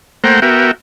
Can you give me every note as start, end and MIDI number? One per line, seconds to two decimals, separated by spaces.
0.24 0.40 57
0.24 0.40 58
0.24 0.40 72
0.24 0.40 78
0.24 0.40 79
0.24 0.40 82
0.42 0.71 59
0.42 0.71 66
0.42 0.71 70
0.42 0.71 76
0.42 0.71 79